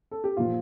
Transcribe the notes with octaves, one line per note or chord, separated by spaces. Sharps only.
A4
G4
A#2 F3 F4